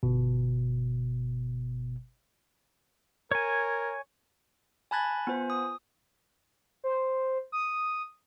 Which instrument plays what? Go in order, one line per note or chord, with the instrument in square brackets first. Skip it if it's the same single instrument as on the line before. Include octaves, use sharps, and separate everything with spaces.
[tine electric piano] G1 B2
[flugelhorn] A#4 [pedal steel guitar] C#5 G#5
[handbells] G#5 A5 B5 F#6 G#6 A6
B3 F4 C5 G#5
D#6
[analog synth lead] C5
D#6